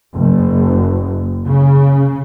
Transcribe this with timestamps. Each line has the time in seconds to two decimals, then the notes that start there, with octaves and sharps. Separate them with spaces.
0.16 F#1
1.47 C#3